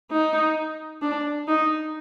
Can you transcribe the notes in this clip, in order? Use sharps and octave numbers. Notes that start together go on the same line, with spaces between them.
D#4
D4
D#4